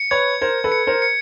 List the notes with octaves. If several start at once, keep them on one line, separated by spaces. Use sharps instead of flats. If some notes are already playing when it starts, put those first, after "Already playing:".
Already playing: C#7
B4 C#5 G#6
A#4 C5 G#6
A4 B4
C#7
A#4 C5
C#7